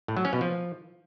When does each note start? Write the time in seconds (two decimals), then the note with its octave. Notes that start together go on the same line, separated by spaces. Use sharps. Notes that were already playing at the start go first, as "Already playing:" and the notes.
0.08 A2
0.17 F#3
0.25 C#4
0.33 B2
0.41 F3